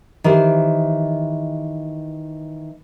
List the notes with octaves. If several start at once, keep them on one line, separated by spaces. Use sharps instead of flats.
D#3 E3 G4 C5